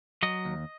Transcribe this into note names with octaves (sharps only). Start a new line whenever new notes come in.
F#3 D#5
D#2